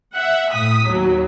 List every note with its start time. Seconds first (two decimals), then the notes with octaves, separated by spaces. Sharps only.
0.14 E5 F#5
0.52 A2 D#6 B6
0.86 D#2 F#3